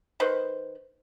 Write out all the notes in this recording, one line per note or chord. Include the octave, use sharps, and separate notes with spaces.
D#3 B4 C5